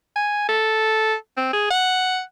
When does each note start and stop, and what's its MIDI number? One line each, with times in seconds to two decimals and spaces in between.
0.16 0.46 80
0.48 1.14 69
1.37 1.50 60
1.53 1.67 68
1.70 2.21 78